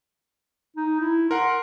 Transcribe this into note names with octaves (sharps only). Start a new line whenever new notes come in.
D#4
E4
A#4 F#5 C6